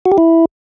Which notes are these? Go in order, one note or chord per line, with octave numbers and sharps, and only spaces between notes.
F#4
G4
E4